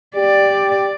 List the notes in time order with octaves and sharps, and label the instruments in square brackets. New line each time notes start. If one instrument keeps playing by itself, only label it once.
[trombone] G4 [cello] D5